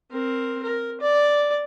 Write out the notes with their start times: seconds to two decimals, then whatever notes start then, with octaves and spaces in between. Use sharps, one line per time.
0.11 C4 A#4
0.63 A#4
1.01 D5